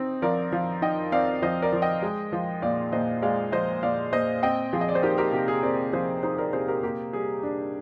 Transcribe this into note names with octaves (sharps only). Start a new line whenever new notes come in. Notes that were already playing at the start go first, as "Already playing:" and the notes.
Already playing: C4 D#4
F3 A#4 D5
F3
D#4 D#5 G5
C4 D5 F5
F3 C5 D#5
A#4 D5
F3
D#5 G5
G#3
F3
A#2 D5 F5
A#2 C5 D#5
G#3 D5 F5
F3 C5 D#5
A#2 D5 F5
A#2 C5 D#5
C4 D#5 G5
F3 G#4
D#5
D5
C5
D#4 G4 A#4
G4 A#4
C3 G4
G#4
C4 A#4 D5
F3 G#4 C5
D#4 G#4 C5
A#4 D5
C3 G#4 C5
G4 A#4
A#3 G4
G3 G#4
D4